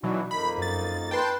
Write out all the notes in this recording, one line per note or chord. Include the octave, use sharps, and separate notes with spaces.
B2 E3 F#3 D4 D#4 F#4
F2 A#3 D#4 B5
F#2 A6
B4 G5 A5 C6